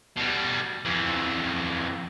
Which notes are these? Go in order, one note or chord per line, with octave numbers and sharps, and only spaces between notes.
B2 G3
F2 E3